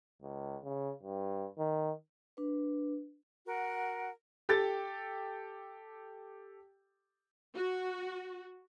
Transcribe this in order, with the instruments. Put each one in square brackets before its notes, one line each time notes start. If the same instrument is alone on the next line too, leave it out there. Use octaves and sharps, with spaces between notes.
[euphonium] C#2
C#3
G2
D#3
[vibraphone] D4 B4
[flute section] F#4 A#4 F#5
[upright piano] G4 A4 G5 A6
[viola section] F#4